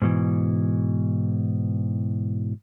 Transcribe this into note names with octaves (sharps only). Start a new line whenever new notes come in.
G#2 B2 E3